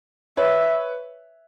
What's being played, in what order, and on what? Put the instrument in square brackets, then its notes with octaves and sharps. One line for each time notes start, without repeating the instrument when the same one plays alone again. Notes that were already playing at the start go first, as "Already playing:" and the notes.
[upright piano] B4 C#5 [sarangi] E5